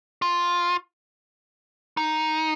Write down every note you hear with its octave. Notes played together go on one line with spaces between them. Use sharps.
F4
D#4